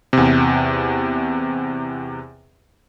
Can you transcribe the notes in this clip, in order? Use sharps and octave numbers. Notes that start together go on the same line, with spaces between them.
E2 C3